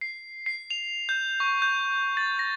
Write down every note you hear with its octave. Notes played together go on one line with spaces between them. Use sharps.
C7
C7
F7
G6
C#6
G6
A6
A#6